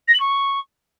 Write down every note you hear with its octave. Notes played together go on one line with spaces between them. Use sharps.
A#6
F#7
C#6